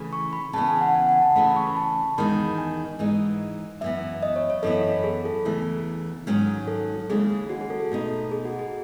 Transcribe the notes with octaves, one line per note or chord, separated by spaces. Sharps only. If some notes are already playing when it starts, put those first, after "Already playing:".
Already playing: C#3 E3 A3 C#4 E4
C#6
B5
C#3 E3 B3 A5
G#5
F#5
G#5
F#5
A5
C#3 E3 A3 C#4 B5
B5
C#6
B5
A5
E2 D#3 G#3 B5
G#5
G#2 E3 G#3 D#4
F#2 E3 B3 E5
D#5
C#5
C#5
F#2 E3 B3 E4 A4
G#4
A4
E2 C#3 E3 A3
G#2 D#3 F#3 C#4
A4
D#2 C#3 G#3 C#4 E4 G#4
F#4
G#4
A4
A4
B2 A3 D#4 A4
G#4
F#4
G#4